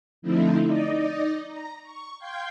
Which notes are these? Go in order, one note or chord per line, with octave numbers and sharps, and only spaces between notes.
D3 F3 A3 C4 D#4 E4
D#4 D5 D#5
A#5
C#6
F5 G5 C6 G6 G#6